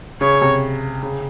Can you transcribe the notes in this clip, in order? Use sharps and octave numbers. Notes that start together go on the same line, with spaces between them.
C#3 C#5
C3
C#3